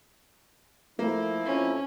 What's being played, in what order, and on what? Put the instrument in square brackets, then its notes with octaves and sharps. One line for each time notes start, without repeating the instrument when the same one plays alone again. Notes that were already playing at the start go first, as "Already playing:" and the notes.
[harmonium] F3 E4 [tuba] A3 [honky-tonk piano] A#3
[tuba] F2 [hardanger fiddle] C#4